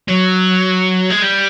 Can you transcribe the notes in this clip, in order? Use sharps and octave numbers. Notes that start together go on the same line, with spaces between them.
F#3
G#3
G3